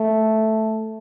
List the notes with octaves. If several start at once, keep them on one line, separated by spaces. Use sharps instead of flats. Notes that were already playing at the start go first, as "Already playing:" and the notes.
Already playing: A3